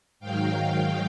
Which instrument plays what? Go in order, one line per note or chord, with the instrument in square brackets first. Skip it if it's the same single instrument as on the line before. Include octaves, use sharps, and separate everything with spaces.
[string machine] G#2 D#3 F#3 F5 G5